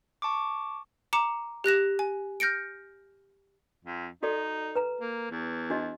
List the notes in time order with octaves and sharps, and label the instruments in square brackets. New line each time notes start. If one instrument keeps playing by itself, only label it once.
[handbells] A5 C#6 D6
[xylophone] A#5 D6 C#7 E7
G4 F#6 A#6 E7
G#5
F6 G6 A#6 C#7 D7
[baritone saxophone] F2
[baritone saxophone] D#4 [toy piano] F#4 A4 D5
[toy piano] B4 A#5
[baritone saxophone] A#3
E2
[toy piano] D4 F#4 D#5